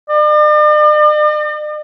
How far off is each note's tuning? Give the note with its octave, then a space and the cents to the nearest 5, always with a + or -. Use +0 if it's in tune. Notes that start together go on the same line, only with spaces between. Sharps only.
D5 +45